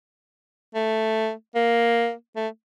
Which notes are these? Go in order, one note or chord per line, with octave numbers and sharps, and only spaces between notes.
A3
A#3
A3